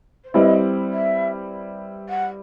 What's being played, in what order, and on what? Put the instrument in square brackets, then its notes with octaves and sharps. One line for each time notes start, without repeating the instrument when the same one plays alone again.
[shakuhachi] C5
[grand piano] G3 C4 E4 B4 [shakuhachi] D#5
[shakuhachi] E5
F#5